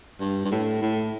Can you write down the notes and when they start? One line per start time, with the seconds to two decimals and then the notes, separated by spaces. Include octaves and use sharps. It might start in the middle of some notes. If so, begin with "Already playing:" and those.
0.20 G2
0.45 G2
0.51 A2
0.82 A2